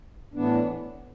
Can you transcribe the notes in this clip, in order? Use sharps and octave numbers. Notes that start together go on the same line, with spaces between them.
A2 E3 B3 D4